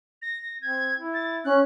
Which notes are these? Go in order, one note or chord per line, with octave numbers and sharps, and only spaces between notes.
A#6
C4 G#6
E4
A6
C#4 F#6